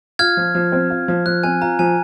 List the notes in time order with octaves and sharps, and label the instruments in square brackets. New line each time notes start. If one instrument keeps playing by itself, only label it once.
[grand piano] F4 [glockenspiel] F6 G#6
[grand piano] F3
F3
C4
F4
F3
[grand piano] F3 [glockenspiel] F#6
[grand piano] C4 [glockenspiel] G#5
[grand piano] F4 [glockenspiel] A#5
[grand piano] F3 [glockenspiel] G#5